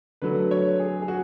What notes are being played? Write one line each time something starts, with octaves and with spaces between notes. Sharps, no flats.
D3 F#3 A3 B4
C#5
G#4
G#4
F#4